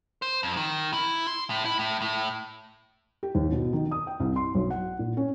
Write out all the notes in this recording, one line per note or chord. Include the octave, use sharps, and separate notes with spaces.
C5
F2
D#3
E4
C6
A2
E4
A2
A2
G4
D#2
B2
D#3
D#6
G5
C2
C6
B1
F#5
A#2
C#4